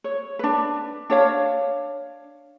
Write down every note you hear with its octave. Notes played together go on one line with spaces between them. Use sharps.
C#5
D4 B4
D4 C#5 F5